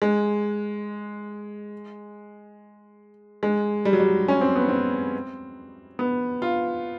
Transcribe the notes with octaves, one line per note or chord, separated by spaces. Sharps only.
G#3
G#3
G3
F#3
G3
C#4
C4
B3
C4
B3
F4